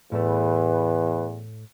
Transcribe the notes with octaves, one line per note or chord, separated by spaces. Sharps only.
E2 A2 A3 B4